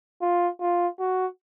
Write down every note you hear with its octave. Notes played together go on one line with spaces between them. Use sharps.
F4
F4
F#4